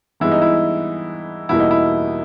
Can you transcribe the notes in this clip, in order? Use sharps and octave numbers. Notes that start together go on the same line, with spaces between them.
G2 E3 G#3 B3 E4
D#4
E4
E2 B2 G3 A#3 E4
D#4
E4